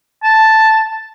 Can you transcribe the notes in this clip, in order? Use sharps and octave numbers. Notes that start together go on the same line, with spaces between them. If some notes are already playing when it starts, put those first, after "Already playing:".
A5